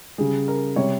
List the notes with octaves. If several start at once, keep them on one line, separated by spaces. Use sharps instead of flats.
C#3 G3 G#4
A#4
C3 G3 C#5